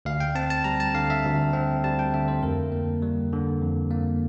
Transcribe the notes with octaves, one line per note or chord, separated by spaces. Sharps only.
D2 F5
G5
C4 A5
A5
G3 A#5
A5
D3 F5
E5
D2
C4
G3 A5
G5
D3 E5
C5
F2 A#4
A#3
G3
D3
F2
A#3